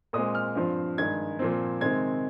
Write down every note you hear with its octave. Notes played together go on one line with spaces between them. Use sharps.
A#2 G#3 C4 D#6
F6
G2 F3 C4
G2 D#3 G#3 G#6
A#2 F3 C4
C3 D#3 G#3 C4 G#6